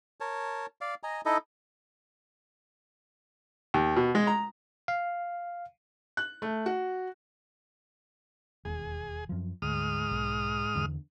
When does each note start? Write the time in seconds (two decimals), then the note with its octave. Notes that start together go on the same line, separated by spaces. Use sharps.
0.20 A#4 C#5 A5
0.81 D5 F5
1.03 D#5 G#5 A#5
1.25 D#4 E4 A4 D#5
3.74 D#2
3.96 B2
4.15 G#3
4.27 A#5
4.88 F5
6.17 F#6
6.42 A3
6.66 F#4
8.65 E1 D#2 G#4
9.29 F#2 F3
9.62 D2 G#2 D#6 F6
10.11 B1
10.75 E2 D3